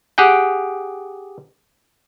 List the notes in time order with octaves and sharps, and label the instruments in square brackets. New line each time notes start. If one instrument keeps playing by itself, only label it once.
[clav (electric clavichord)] G4 G#4 F#5 G5